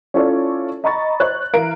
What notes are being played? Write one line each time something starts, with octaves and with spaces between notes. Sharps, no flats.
C#4 E4 F4 A4 C#5 D5
D#5 A#5 B5 C#6 A6
C5 C#5 F#6
E3 E4 A#4 F5 A#5 D7